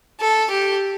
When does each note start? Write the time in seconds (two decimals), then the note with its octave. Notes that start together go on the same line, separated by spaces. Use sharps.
0.20 A4
0.50 G4